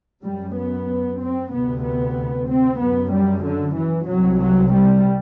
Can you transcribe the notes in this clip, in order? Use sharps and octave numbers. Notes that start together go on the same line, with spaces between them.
F#2 G3
B3
C4
D2 C3 B3
B3
C4
F#2 B3
G3
D3
E3
C2 C3 F#3
F#3
G3